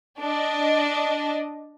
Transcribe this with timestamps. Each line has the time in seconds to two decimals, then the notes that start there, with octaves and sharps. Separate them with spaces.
0.20 D4 D#5